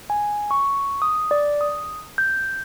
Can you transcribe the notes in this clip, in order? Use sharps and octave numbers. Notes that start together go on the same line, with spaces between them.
G#5
C#6
D#6
D5
D#6
G6